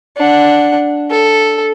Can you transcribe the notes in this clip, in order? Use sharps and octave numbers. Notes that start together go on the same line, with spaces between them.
D4 F#5
A4